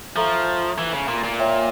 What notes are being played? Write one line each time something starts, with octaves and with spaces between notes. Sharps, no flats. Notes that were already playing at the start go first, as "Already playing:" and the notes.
F3 A4 E5 A#5 C#6
E3
C#3
A#2
A#2
C#5 E5 G5